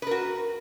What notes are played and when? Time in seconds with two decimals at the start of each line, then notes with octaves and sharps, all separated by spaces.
0.02 B4
0.07 A#4
0.11 F#4